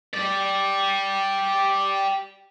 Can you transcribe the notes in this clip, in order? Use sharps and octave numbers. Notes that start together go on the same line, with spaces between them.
G4 D5